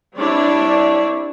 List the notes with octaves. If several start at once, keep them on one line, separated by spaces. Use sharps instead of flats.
G3 C4 D4 E4 C#5 D5